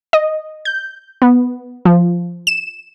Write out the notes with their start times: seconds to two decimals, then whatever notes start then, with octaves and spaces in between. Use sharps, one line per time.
0.13 D#5
0.65 G6
1.22 B3
1.85 F3
2.47 E7